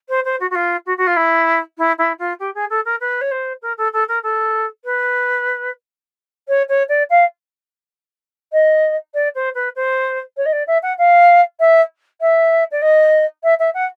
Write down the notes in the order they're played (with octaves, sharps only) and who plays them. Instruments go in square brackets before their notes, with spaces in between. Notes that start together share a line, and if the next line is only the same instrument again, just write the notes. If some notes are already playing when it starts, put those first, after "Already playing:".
[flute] C5
C5
F#4
F#4
F4
F#4
F#4
F4
E4
E4
E4
F4
G4
G#4
A4
A#4
B4
C#5
C5
A#4
A4
A4
A#4
A4
B4
C#5
C#5
D5
F5
D#5
D5
C5
B4
C5
C#5
D#5
D5
E5
F#5
F5
E5
E5
D5
D#5
E5
E5
F#5